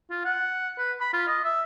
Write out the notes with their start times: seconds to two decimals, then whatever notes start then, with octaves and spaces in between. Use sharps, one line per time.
0.10 F4
0.25 F#5
0.78 B4
1.01 B5
1.13 F4
1.28 D#5
1.44 E5